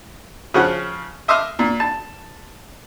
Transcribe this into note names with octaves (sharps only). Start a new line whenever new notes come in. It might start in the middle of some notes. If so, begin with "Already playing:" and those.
C#3 F3 F#5
D#5 E5 C6 D6 D#6 F6
A#2
A5